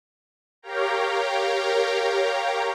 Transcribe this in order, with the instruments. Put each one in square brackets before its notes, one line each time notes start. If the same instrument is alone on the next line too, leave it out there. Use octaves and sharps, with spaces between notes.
[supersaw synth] G4 A#4 C#5 F5 G5 A#5